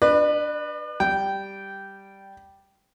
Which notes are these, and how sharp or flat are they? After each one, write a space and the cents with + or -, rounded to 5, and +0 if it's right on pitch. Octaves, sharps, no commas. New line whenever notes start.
D4 +0 B4 +0 D5 +45
G3 +0 G5 -10